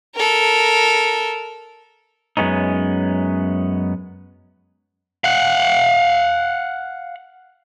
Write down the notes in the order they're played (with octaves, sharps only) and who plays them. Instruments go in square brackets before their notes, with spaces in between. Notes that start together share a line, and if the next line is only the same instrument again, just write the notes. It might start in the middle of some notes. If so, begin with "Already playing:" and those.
[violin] A4 A#4
[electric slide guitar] F#2 G#3 B3 C#4 D#4
[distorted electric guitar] F5 F#5